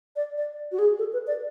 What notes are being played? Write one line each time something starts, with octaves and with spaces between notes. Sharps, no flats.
D5
D5
F#4
G#4
A4
B4
D5